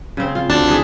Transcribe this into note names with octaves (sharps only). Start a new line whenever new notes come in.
C#3 C4
F4
D2 D4 A5
E3 G#4